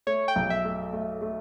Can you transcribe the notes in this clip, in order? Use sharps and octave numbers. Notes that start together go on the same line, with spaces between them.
A3 C#5
G5
B1
E5
A3
A3
A3